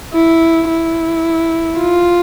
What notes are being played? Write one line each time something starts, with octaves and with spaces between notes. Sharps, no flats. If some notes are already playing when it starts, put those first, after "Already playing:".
E4
E4
F4